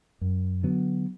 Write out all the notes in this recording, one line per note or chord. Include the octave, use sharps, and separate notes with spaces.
F#2
D3 F#3 B3